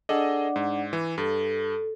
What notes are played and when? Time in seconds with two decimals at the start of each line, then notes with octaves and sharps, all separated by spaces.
0.09 D4 G#4 A4 D5 D#5 F#5
0.56 G#2
0.93 E3
1.18 G2 A4